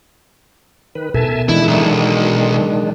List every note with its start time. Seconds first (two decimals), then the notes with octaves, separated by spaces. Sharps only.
0.95 D#3 B4
1.14 B2 A4 A#4 E5 G#5 A5
1.49 D#3 E3 G#3 D4 E4
1.68 B1